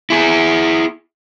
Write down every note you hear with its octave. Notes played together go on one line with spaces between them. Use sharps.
E4 G#4